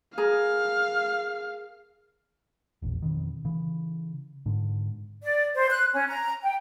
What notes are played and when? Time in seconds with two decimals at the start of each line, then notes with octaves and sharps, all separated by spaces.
0.18 G#4 A#4 F5
2.82 E1 A#1
3.02 F2 B2 D#3
3.45 C#3 E3
4.46 G#2 D3
5.23 D5
5.56 C5
5.71 F#6
5.94 C#4
6.08 A#5
6.44 G5